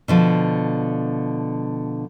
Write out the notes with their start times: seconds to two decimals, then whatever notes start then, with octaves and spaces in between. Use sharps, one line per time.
0.08 B2 D3 F3